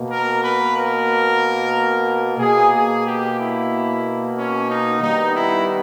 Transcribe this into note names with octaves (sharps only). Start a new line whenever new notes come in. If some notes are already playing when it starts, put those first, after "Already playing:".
Already playing: B2 A#3
A#4
B4
A#4
B2 A#3 G#4
G#4
G4
E4
C#4
D#4
D#3 G3 B3 D#4
E4